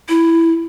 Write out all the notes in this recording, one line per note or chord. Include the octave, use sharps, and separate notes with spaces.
E4